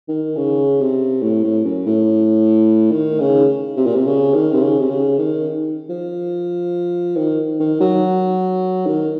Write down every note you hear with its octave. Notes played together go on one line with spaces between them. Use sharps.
D#3
C#3
C3
A2
A2
F#2
A2
D#3
C#3
C3
A#2
C3
C#3
D#3
C3
C#3
C3
C#3
D#3
F3
D#3
D#3
F#3
D#3